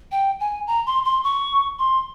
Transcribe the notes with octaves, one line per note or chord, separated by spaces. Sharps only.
G5
G#5
A#5
C6
C6
C#6
C6